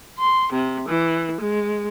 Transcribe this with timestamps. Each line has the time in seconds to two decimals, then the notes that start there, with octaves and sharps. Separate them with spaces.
0.19 C6
0.53 C3
0.89 E3
1.40 G#3